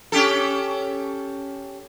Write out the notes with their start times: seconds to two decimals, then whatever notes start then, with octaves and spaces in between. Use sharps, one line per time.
0.12 C#4 G4 A4